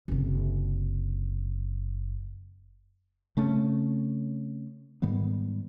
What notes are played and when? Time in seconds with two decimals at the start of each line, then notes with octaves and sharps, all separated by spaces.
0.08 F#1 C3
3.37 C#3 A3 C4 C#4
5.02 G#2 D#3 G3 B3